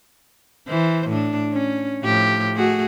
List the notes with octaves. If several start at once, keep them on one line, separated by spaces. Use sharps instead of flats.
E3 C5
A2 D4
C#4
A2 F3 G4
A3 F#4 G#4